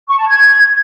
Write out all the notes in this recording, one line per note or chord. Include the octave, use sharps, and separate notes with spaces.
C#6
A5
G#6